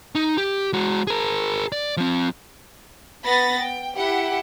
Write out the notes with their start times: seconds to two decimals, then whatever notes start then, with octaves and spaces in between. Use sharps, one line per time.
0.15 D#4
0.37 G4
0.73 G#3 F#4
1.07 G#4 A#4
1.72 D5
1.97 F3 C4
3.22 B3 B5 A6 A#6
3.61 G5
3.94 E4 G4 F#5